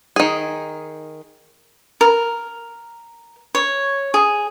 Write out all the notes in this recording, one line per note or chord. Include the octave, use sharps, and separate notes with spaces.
D#3 G#4
A#4
C#5
G#4